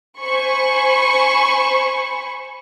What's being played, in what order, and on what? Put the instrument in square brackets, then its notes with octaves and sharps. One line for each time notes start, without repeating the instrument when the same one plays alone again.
[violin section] C5 G#5 B5 C#6